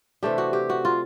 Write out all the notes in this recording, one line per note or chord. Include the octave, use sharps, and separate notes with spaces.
C3 E3 A3 D4 G4
F#4
G4
F#4
F4